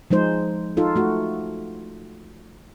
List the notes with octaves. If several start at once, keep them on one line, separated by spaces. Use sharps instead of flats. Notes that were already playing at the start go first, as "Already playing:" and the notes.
F3 G#3 D#4 C5
D#4 F4 A4
A3 F#4